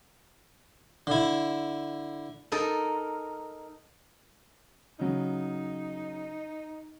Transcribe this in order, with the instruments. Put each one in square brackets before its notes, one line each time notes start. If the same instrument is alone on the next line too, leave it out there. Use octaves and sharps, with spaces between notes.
[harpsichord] D3 E4
[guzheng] D#4 A4 A#4
[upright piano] C#3 F#3 [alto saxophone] D#4